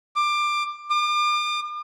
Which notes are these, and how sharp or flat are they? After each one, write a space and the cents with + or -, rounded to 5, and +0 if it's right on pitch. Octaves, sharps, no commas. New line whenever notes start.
D6 +20
D6 +40